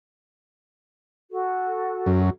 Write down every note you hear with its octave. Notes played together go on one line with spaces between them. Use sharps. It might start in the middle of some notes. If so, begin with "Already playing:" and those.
F#4 A4
F#2